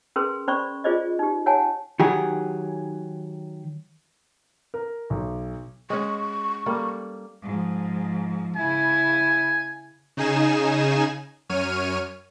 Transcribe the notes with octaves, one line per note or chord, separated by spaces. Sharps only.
C#4 G#4 A#4 B4 C6
C#4 C5 D5 B5 C#6
F4 G#4 C5 D5 D#5
D#4 G4
C#5 F#5 G#5 A5
D#3 F#3 G4 G#4
A#4
B1
G#3 C#4 C#6
G3 A#3 A4
G#2 F3
C#3 E4 G#5
C#3 D#4 G#4 G#5 E7
F#2 C#5 F6 D#7